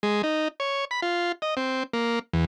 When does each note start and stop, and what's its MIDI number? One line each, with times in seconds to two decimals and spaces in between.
0.03 0.22 56
0.23 0.48 63
0.60 0.85 73
0.91 1.00 83
1.02 1.32 65
1.42 1.54 75
1.57 1.83 60
1.93 2.19 58
2.33 2.45 40